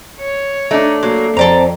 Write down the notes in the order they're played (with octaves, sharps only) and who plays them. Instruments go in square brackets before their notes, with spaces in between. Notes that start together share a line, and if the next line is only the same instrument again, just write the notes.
[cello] C#5
[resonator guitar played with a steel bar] A3 D4 [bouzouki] D#4
[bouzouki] F#3 [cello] A#3
[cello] F2 [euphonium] C4 [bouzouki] A4 D5 A#5